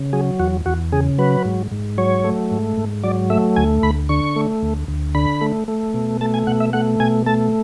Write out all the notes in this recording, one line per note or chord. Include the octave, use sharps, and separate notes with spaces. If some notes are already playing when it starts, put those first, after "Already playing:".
Already playing: C#3
F#3 G#4
E2 F#4
E2 F#4
C#3 G#4
F#3 B4
G#2
G#2
F#3 C#5
A3
G#2
G#2
F#3 D5
A3 E5
D2 G#5
D2 B5
D3 C#6
A3
D2
D2
D3 B5
A3
A3
B2
A3 A5
G#5
B2 F#5
E5
A3 F#5
B2 G#5
A3 A5